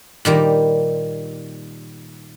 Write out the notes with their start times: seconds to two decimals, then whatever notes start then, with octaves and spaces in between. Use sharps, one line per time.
0.25 A#2 D#3 G3 A#5